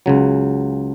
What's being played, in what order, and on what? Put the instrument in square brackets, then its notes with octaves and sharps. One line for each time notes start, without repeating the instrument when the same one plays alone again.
[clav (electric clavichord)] C#2 C#3 F#3